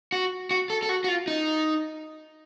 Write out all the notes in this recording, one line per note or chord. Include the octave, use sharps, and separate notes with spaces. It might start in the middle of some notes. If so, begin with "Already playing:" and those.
F#4
F#4
A4
A4
F#4
F#4
F4
D#4